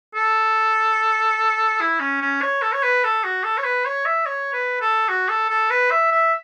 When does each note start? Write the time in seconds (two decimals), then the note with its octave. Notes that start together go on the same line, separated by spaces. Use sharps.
0.15 A4
1.80 E4
2.00 C#4
2.21 C#4
2.42 C#5
2.62 A4
2.73 C#5
2.83 B4
3.04 A4
3.24 F#4
3.44 A4
3.58 C#5
3.64 B4
3.85 C#5
4.05 E5
4.26 C#5
4.53 B4
4.81 A4
5.09 F#4
5.29 A4
5.49 A4
5.70 B4
5.91 E5
6.11 E5